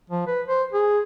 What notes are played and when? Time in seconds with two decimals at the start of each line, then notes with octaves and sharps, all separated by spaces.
0.10 F3
0.27 B4
0.48 C5
0.73 G#4